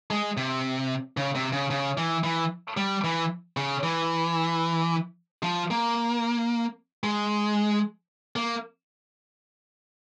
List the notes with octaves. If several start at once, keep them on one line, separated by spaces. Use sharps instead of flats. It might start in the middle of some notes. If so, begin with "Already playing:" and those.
G#3
C3
C#3
C3
C#3
C#3
E3
E3
G3
E3
C#3
E3
F3
A#3
G#3
A#3